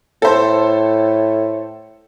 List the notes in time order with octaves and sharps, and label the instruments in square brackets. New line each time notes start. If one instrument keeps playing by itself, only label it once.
[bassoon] A2 [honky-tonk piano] A4 C5